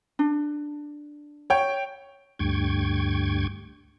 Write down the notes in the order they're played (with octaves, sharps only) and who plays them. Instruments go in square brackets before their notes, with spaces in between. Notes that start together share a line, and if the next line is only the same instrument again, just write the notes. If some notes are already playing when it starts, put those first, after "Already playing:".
[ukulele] D4
[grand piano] C#5 G5
[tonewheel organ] D2 G2 G5 C#6 G#6